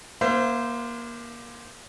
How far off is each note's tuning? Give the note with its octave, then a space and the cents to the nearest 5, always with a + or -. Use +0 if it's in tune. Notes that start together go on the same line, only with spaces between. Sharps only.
A#3 +25 C5 -15 E5 +40